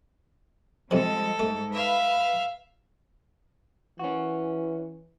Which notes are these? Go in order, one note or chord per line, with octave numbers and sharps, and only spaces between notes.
F2 C3 F3 G3 G#3 A4
G#2 A3
B4 E5 F5
E3 C#4 F#4